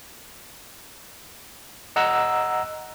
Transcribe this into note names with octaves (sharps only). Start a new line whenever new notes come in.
D#5 F#5 A#5 E6